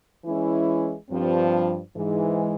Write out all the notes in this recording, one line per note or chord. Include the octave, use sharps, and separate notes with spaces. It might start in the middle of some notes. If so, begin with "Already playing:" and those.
E3 G#3 C#4 E4
G2 F3 C4
G#2 E3 G#3